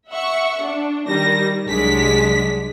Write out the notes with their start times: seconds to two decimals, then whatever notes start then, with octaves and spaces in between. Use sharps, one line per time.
0.11 E5 F#5 C#6
0.62 D4
1.07 D#3 G3 A#6
1.65 C2 F#3 G#3 D4 B6